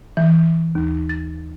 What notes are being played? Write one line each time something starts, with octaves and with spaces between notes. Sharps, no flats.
E3
D#2
A6